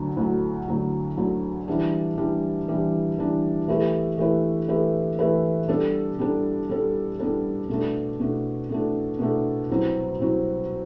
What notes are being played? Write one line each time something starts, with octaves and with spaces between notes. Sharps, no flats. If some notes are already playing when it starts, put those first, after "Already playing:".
Already playing: D2 D3 F#3
D2 D3 F#3
D2 D3 F#3
D2 D3 F#3
E3 G3 D4
E3 G3 D4
E3 G3 D4
E3 G3 D4
E3 A3 E4 G4 B4
E3 A3 E4 G4 B4
E3 A3 E4 G4 B4
E3 A3 E4 G4 B4
G3 B3 D4 A4
G3 B3 D4 A4
G3 B3 D4 A4
G3 B3 D4 A4
B2 A3 D4
B2 A3 D4
B2 A3 D4
B2 A3 D4
C2 B2 F#3 C4 F#4
C2 B2 F#3 C4 F#4